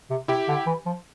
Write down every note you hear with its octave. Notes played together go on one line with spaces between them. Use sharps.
C3
C3 E4 G4
D3
E3
F3